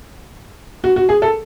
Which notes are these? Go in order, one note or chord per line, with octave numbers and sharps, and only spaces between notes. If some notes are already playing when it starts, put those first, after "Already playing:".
F#4
F#4
G#4
A4